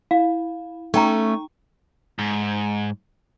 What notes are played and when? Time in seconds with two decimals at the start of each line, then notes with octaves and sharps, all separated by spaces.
0.11 E4 F5
0.94 A3 C#4 D#4 G5 A#5 C#6
2.19 G#2